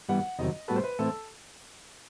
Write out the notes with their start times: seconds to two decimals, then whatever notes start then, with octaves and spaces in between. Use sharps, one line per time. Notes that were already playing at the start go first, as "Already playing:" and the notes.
0.08 G2 E3 G3 B3 F#5
0.39 E2 C3 D#3 F#3 D#5
0.68 A2 G3 B3 F#4 A4 B4
0.76 C5
0.84 B4
0.98 A2 E3 A3 C4 A4